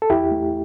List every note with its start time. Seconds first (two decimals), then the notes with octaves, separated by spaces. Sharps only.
0.02 A4
0.10 E2 E4 G4
0.31 A3